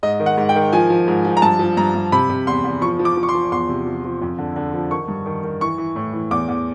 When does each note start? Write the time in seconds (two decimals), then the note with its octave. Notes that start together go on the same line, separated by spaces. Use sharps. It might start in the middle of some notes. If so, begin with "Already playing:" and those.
0.03 G#2 D#5
0.20 D#3
0.26 F#5
0.37 G#2
0.49 G5
0.55 D#3
0.73 F3 G#5
0.90 F3
1.08 G#2
1.25 F3
1.37 A#5
1.42 G2 A5
1.59 F3
1.77 G2 A#5
1.95 G2
2.12 C3 B5
2.30 C3
2.47 E2 C6
2.64 E2
2.81 F3 C#6
2.99 F3
3.05 D6
3.17 F3
3.23 C#6
3.29 C6
3.34 F3
3.52 E2 C6
3.69 C3
3.87 F3
4.04 F3
4.22 F2
4.38 D3
4.56 D3
4.74 F3
4.91 D#3 C#6
5.08 G2
5.26 D#3
5.44 D#3
5.61 E3 C#6
5.78 E3
5.96 A2
6.13 E3
6.31 E2 D6
6.48 E2